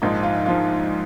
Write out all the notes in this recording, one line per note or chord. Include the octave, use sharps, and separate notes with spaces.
A#1 G#2 F3 D#4
F4
F3 F4